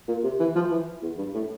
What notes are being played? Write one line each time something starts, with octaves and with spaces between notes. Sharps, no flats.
A#2
C3
E3
F3
E3
E2
G2
A2